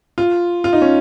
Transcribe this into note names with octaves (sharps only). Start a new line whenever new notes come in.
F4
F4
D#4
C#4